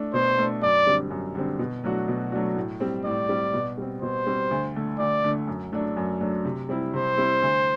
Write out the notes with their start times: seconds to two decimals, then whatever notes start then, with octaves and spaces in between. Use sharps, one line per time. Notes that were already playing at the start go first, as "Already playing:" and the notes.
Already playing: A3 D4
0.14 B2 C5
0.38 A3 D4
0.62 F#2 D5
0.86 D3 G3 C4
1.11 F#2
1.35 D3 G3 C4
1.59 B2
1.84 F#3 A3 D4 F#4
2.08 B2
2.32 F#3 A3 D4 F#4
2.56 A2
2.80 G3 C4
3.05 A2 D5
3.29 G3 C4
3.54 B2
3.78 G3 C4
4.02 B2 C5
4.27 G3 C4
4.51 D2
4.75 D3 A3
4.99 D2 D5
5.24 D3 A3
5.48 F#2
5.72 F#3 A3 D4
5.97 F#2
6.21 F#3 A3 D4
6.45 C3
6.69 G3 C4 E4
6.94 C3 C5
7.18 G3 C4 E4
7.42 D2